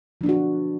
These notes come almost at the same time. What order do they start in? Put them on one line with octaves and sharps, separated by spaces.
F3 D4 B3 F#4